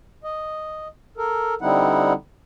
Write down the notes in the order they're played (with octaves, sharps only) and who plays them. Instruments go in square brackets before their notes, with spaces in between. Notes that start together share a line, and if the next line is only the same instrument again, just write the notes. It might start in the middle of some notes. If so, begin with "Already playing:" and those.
[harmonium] D#5
A4 A#4
D3 G3 C4 D#4 E4 F#5